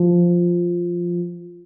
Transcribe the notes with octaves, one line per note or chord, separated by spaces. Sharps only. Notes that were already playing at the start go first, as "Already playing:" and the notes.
Already playing: F3